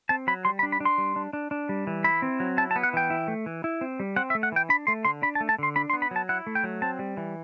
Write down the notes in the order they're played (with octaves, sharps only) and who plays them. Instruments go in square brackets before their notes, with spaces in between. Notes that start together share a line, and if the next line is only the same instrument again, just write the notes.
[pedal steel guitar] C4 A5
F#3 B5
G3 C6
B5
D4
B5
D4
C6
G3
D4
D4
D4
G3
E3
E4 B5
C4
F#3
E4 A5
A5
B3
F#5
E3 G5
E4
A3
E3
E4
C4
G3
C4 F#5
E5
A3
F#5
E3 G5
D4 B5
A3 C6
D3 C6
D4 B5
A5
A3
A5
D3 C6
D4 B5
C6
B3
B5
F#3 A5
E4 F#5
A3
G5
F#3
C4 A5
G3
E3